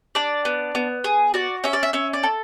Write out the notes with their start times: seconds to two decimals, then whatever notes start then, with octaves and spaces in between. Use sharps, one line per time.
0.15 D4 D5
0.45 B3
0.75 B3
1.04 G#4
1.34 F#4 D5
1.64 C#4 E5
1.73 D5
1.83 E5
1.93 C#4 E5
2.13 D5
2.23 A4